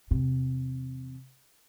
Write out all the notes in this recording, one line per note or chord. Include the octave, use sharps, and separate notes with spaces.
E2 C3